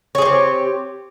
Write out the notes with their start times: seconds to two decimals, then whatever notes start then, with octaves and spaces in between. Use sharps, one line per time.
0.15 C#5
0.18 G#4
0.22 C4
0.25 G4